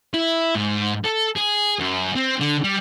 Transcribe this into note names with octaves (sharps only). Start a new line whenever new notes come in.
E4
G#2
A4
G#4
F#2
C4
D3
G3